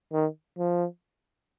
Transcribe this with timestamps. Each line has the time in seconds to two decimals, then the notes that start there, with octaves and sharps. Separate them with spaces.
0.13 D#3
0.58 F3